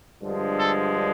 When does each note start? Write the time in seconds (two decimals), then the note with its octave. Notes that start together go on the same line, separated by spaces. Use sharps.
0.21 G2 D3 F3 G#3
0.59 A4